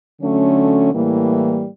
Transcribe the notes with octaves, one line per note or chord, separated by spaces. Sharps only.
D3 F#3 A3 C#4
A2 E3 G3 A#3